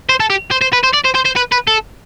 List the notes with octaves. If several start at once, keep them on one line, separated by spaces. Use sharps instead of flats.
C5
A4
G4
C5
C5
B4
C5
D5
C5
C5
C5
B4
B4
A4